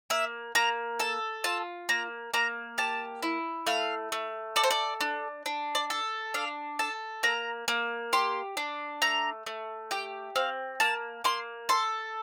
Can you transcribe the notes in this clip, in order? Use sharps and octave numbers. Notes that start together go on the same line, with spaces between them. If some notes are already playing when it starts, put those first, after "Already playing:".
A#3 E5
A#3 A#5
A4 A5
F4 A5
A#3 A#5
A#3 A#5
G4 A5
E4
A3 F5
A3
A4 D5
C5
D5
D4
D4
D5
A4
D4 F5
A4 A5
A#3 A#5
A#3
G4 C6
D4
A3 A#5
A3
G4 G5
C4 F5
A#3 A5
A#3 C6
A4 C6